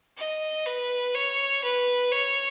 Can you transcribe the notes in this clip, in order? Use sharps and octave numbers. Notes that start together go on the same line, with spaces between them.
D#5
B4
C#5
B4
C#5